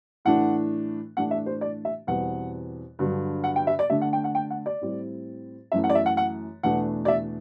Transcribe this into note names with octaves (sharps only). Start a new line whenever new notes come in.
A2 E3 A3 D4 F#5
A2 E3 A3 D4 F#5
E5
C5
D5
E5
E2 B2 G3 C4 F#5
G2 D3 F#3
F#5
G5
E5
D5
D3 A3 D4 E5
F#5
G5
F#5
G5
F#5
D5
A2 G3 C4
F#2 E3 A3 E5
F#5
D5
E5
F#5
F#5
E2 B2 A3 D4 F#5
D5
E5